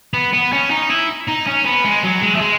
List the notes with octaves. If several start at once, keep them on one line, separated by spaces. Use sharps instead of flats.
B3
B3
C#4
D#4
E4
D#4
C#4
B3
G#3
F#3
G#3
A3
G#3